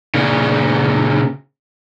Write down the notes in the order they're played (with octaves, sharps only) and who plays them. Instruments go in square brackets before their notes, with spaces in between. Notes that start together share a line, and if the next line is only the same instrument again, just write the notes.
[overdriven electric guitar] A#2 C#3